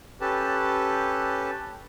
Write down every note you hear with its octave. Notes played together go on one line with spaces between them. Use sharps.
C#4 G4 A4 B4 A5